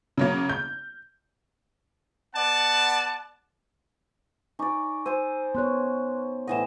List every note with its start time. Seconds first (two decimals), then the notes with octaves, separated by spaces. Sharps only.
0.18 C#3 F#3 A#3
0.50 G6
2.35 B3 D5 F#5 A5
4.59 D#4 D5 G#5 C#6 D6
5.06 C5 G#5 E6 D#7
5.55 B3 C#5 C6 F#6
6.47 A2 E3 D#5 F#5 E7